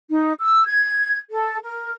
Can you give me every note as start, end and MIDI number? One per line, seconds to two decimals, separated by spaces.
0.09 0.33 63
0.41 0.62 88
0.66 1.18 92
1.30 1.57 69
1.63 1.92 70